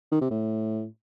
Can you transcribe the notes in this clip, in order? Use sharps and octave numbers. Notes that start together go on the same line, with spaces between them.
D#3
C3
A2